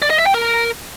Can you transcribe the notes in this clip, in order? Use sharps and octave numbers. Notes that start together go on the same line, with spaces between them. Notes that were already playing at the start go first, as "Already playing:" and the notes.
D5
D#5
E5
G5
A#4